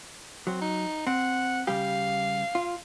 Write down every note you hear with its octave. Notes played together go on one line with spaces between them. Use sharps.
F#3 C4
D#4
C4 F#5
C#3 G3 G4 F5
F4